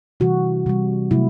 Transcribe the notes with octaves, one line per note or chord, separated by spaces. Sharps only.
C3 E3 G3 F#4
C3 E3 G3
C3 F#3 A3 E4